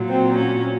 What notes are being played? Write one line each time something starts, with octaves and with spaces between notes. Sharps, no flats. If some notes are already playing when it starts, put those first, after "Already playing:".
Already playing: A#2 F#3
C4
C#4